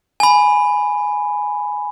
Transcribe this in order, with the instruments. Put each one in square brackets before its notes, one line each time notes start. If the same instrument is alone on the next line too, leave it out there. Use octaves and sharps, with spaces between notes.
[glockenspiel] G#5 B5